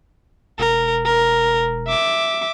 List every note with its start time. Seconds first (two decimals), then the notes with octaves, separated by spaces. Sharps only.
0.58 E1 A#4
1.05 A#4
1.87 E5 D6